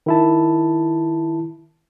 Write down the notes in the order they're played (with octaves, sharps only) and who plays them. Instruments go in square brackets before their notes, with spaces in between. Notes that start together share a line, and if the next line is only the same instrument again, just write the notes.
[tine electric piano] D#3 E4 A5